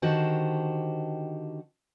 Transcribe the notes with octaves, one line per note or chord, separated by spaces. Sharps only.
D3 D#3 F#4 G4 C5 A5